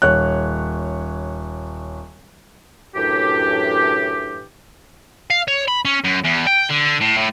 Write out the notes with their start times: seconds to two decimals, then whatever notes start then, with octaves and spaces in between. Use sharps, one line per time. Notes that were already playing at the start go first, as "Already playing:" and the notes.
0.02 D#1 C#5 F#6
2.95 F#2 A2 E3 D4 G4
5.30 F5
5.48 C#5
5.68 B5
5.85 C#4
6.04 F#2
6.24 E2
6.47 G5
6.70 D3
7.01 A2
7.18 A2